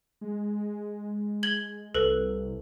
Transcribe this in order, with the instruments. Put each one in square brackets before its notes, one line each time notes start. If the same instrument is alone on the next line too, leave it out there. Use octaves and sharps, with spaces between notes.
[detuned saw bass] G#3
[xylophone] G#6 F#7 G7
[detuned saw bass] C2 [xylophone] A4 B4